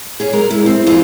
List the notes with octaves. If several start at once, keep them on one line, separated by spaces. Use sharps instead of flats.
C#4 G#4
G#3 A#4
E4
C4
F2 A3 F4 G#4 A5